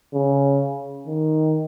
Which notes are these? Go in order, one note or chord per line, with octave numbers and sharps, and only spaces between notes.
C#3
D#3